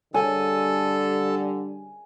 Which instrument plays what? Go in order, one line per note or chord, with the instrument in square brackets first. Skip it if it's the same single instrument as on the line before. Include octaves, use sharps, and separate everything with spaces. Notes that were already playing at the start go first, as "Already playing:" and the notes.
[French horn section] D3 G3 [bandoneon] A4 [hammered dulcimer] G#5